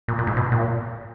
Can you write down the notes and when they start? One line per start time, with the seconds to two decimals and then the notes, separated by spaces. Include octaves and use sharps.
0.08 A#2
0.18 A#2
0.27 G#2
0.37 B2
0.52 A#2